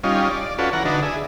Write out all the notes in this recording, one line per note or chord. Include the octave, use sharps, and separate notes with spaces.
G3 C#4 D#4 F4
D5
C#4 F4 F#4 A4 B4
E3 F#5 A#5
D3 D4 D#4 F#4 B4
G#4 E5